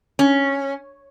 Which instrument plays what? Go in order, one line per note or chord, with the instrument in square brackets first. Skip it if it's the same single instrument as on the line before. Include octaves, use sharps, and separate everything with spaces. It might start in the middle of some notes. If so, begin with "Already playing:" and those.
[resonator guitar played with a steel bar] C#4